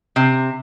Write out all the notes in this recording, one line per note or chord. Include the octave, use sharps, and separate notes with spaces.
C3